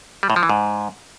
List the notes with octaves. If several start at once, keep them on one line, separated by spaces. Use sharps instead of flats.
G3
A2
F3
E3
G#2